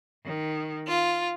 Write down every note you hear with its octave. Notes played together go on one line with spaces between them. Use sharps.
D#3
F4